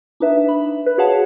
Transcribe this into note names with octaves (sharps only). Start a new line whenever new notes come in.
D4 D#4 B4 E5
B5
B4
F#4 G#4 C#5 F5 F#5 A5